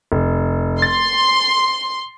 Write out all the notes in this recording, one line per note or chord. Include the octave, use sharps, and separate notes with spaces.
F1
C6 A6